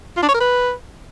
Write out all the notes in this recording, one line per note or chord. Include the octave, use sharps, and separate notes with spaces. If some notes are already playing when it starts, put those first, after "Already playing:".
F4
D4
C#5
A#4
B4